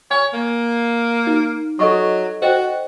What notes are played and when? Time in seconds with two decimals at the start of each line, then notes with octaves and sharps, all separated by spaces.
0.11 C#5 G#5
0.34 A#3
1.27 D#4
1.79 F#3 A4 D#5 C#6
2.42 F#4 C5 D#5 G5